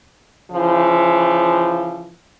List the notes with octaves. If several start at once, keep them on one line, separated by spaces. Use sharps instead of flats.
C#3 E3 F3